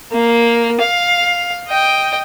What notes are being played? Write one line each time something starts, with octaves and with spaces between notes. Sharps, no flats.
A#3
F5
D#5 G5